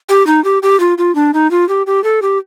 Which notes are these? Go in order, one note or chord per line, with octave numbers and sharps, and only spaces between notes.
G4
D#4
G4
G4
F4
F4
D4
D#4
F4
G4
G4
A4
G4